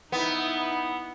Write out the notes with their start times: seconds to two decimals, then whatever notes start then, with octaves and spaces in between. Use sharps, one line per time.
0.12 B3 D#4 E4